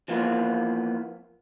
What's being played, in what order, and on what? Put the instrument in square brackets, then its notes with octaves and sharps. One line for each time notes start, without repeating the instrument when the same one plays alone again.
[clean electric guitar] E3 F3 A#3 B3